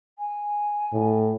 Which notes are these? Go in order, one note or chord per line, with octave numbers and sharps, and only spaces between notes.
G#5
A2